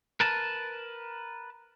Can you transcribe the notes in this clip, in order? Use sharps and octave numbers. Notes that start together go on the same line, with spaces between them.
A#4 B4 A5